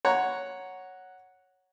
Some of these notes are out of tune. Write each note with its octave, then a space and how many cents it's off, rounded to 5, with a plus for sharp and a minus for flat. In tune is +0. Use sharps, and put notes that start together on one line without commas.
C#5 +0 F#5 +0 A#5 +0